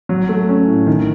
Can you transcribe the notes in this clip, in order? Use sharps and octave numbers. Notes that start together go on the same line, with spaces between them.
F#3
A3
C#4
A2
D#3